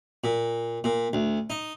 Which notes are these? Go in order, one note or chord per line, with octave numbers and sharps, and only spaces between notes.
A#2
A#2
D2
D#4